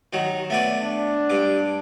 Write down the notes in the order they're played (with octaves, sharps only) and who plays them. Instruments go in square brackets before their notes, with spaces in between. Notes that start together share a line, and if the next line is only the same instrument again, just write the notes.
[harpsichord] D#3 F#3
A3 B3 D5
[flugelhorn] D4
[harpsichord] G2 D6